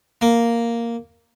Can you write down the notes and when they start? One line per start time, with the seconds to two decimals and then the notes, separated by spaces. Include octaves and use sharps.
0.21 A#3